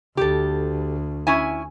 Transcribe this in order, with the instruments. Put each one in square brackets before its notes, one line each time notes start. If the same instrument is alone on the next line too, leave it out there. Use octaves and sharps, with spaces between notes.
[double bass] D2 [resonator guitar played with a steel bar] G4 A4
[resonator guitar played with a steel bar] C#4 E4 G#5